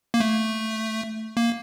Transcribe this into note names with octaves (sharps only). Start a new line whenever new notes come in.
A#3
A3
A#3